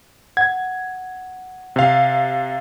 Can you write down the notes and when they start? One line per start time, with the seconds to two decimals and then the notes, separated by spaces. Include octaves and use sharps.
0.37 F#5 G#6
1.76 C3 F5